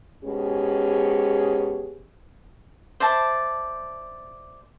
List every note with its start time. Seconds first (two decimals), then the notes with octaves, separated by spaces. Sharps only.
0.24 G#2 B2 C#4 G4 G#4
3.00 C5 D5 E5 A5